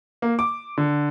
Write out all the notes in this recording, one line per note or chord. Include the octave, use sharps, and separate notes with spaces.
A#3
D6
D3